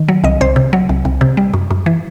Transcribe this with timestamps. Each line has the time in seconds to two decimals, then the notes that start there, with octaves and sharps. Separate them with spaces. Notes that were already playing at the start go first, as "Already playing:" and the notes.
Already playing: D#3
0.08 F#3
0.24 C2 D#5
0.41 C2 C5
0.56 C3
0.73 F#3
0.89 C2
1.05 C2
1.21 C3
1.37 G3
1.54 F#2
1.71 F#2
1.86 E3